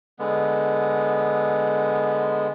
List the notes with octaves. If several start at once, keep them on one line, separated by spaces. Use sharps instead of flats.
D3 G#3 B3